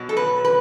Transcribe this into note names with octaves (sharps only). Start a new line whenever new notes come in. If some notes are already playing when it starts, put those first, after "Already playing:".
Already playing: B2 F#3
A4
B4
B4